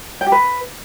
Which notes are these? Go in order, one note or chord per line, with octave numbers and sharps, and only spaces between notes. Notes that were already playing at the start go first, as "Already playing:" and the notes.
G5
G4
B4